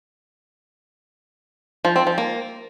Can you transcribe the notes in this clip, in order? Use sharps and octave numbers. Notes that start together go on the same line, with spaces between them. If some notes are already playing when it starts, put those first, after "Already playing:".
F3
C4
F3
A#3